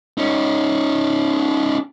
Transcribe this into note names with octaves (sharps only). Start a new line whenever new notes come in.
C#4 D#4